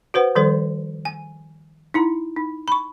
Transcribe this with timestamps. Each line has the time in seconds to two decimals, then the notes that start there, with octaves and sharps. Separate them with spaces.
0.14 F#4 B4 C5 F#5
0.35 D#3 F3 G3 A4 C5
1.05 G#5
1.94 D#4 E4 A#5
2.36 D#4
2.68 B5 C#6